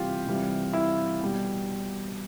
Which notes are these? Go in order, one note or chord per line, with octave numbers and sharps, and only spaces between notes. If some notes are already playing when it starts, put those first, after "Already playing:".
Already playing: C3 E3 G3 F4 G4
C3 E3 G3
E4
B2 G3